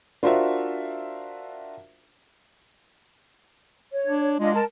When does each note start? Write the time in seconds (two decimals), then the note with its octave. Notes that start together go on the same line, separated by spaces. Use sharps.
0.23 D4 F4 F#4 A#4 C5 E5
3.94 C#5
4.06 D4
4.39 G#3 D4 F4 D#5
4.53 A#4 A5